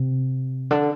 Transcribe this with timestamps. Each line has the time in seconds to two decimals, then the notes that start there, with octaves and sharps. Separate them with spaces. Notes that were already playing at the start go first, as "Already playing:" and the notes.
Already playing: C3
0.71 D3